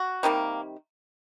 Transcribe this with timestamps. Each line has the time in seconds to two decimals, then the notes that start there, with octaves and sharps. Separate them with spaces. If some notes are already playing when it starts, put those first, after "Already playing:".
Already playing: F#4
0.23 C3 D#3 G3 A#3